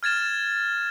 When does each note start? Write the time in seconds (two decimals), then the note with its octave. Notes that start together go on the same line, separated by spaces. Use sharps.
0.03 F6 G#6 A6 E7